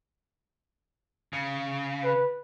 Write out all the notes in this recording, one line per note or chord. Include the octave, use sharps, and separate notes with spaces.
C#3
B4